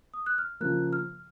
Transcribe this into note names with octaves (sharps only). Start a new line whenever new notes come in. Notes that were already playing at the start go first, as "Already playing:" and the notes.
D#6
F#6
F6
C#3 F3 A#3 F#6
F6